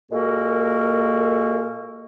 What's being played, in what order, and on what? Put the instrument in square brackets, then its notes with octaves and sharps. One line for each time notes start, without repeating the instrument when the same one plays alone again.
[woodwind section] A#2 G#3 A#3 F#4 A4 A#4